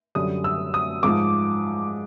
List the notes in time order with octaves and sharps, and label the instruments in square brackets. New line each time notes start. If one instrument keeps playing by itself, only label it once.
[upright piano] F#2 D3 G3 D#6
E6
D#6
G#2 F3 D6